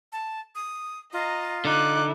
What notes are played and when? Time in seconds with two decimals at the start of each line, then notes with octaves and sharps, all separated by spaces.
0.12 A5
0.55 D#6
1.13 F4 D#5 A#5
1.65 D3 D#4 D6 F#6